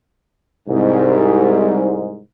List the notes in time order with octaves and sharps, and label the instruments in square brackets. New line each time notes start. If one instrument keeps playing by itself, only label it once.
[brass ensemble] C2 G#2